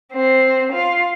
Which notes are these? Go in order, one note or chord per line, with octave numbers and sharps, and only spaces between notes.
C4
F4